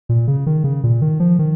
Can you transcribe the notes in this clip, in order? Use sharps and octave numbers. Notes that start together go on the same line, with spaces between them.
A#2
C#3
D#3
C#3
A#2
D#3
F3
D#3